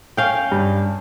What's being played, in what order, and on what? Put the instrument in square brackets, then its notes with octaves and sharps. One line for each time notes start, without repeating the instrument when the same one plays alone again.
[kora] C#4 F5 G5
[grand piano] G2